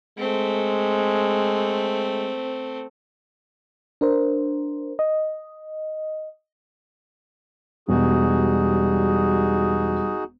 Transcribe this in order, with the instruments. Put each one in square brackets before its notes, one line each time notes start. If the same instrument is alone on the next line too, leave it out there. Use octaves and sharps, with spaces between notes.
[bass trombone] G#3 [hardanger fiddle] A3 C4
[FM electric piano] D4 A#4 C5
D#5
[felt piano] E1 [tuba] G3 [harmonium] D#4 F#4 G#4